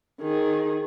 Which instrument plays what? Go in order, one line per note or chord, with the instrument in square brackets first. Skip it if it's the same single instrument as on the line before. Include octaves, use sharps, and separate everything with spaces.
[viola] D#3 G#4